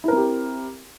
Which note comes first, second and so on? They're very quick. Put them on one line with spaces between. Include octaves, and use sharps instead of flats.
E4 A#4 C4 G4